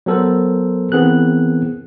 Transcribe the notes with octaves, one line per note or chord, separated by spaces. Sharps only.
F#3 B3 A4 A#4 C5
E3 B3 C4 G#4 A#4 F#6